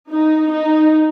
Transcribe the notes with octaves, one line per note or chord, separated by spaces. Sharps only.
D#4
D#4